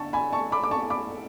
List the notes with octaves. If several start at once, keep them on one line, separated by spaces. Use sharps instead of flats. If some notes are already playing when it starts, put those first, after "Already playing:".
Already playing: D3 A5 C#6
G#5 B5
A5 C#6
B5 D6
D6
A5 C#6
B5 D6